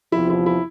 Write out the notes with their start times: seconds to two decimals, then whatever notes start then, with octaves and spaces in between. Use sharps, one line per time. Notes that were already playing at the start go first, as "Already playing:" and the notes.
0.12 E2 C3 F3 E4
0.30 E4
0.46 E4